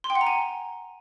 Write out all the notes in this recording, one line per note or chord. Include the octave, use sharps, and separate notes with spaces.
C6
G5
F#5
A#5
G#5